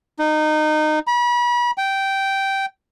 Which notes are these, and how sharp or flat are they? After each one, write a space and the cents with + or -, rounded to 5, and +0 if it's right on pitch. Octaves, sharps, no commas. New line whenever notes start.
D#4 -20
B5 -35
G5 -10